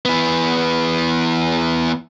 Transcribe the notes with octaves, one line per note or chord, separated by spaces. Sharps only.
E3 B3